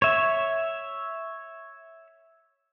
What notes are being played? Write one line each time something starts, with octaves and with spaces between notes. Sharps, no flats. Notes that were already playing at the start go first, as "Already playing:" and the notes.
C#5 E5